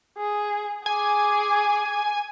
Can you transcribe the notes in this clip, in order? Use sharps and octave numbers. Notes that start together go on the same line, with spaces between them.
G#4
G#4 G#5 D6